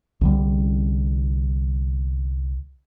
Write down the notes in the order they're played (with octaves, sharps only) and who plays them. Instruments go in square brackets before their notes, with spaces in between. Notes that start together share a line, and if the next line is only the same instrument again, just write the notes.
[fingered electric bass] C2 D3 G3